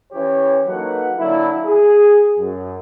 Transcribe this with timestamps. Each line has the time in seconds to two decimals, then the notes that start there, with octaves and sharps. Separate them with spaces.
0.12 E3 C#4 G4 C#5
0.66 F#3 A#3 D#4 A4 B4 F#5
1.18 D3 F#3 A#3 E4
1.65 G#4
2.38 F#2